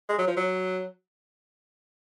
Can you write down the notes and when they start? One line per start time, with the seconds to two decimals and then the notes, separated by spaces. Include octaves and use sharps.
0.09 G#3
0.18 F#3
0.27 F3
0.37 F#3